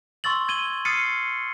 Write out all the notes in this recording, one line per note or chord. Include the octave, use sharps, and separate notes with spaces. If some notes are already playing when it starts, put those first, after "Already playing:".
C6 C#6 E6 A6 F#7
G#6 D#7 F#7 G7
D#6 F6 A6 C7 C#7 D#7